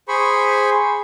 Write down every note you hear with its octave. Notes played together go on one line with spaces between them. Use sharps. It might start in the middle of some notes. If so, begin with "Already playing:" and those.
G#4 C5 B5 C#6